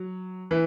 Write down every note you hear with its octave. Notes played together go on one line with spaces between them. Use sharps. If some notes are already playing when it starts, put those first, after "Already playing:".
Already playing: F#3
E3